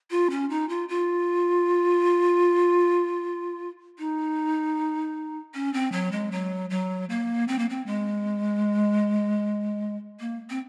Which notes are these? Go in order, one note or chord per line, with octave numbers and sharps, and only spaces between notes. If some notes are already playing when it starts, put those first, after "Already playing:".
F4
C#4
D#4
F4
F4
D#4
C#4
C4
F#3
G#3
F#3
F#3
A#3
C4
A#3
C4
G#3
A#3
C4